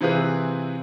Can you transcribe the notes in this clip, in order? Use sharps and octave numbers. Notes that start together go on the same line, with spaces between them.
C3 E3 C4 F4 G#4 B4